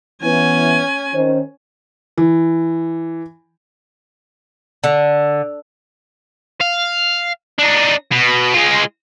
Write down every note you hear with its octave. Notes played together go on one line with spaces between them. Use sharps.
E3 B3 C#4 G#5
D#3 C#4 C5
E3
D3
F5
D4 D#4
B2
G#3 F4